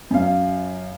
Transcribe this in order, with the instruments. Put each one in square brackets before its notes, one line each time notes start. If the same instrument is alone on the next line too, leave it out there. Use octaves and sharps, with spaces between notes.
[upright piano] F#2 F5